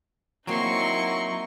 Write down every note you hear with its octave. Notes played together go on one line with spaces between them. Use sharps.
F#3 A#3 C4 D#4 E4 G#4 C6 C#6